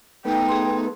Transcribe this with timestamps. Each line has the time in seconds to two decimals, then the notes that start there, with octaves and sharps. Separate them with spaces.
0.25 A3 B3 D#4 G5
0.48 G#4 C6